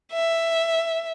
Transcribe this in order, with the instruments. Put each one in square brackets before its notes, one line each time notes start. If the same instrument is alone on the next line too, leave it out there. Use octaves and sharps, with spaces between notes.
[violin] E5